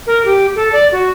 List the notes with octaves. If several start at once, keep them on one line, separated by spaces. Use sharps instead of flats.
A#4
G4
A4
D5
F#4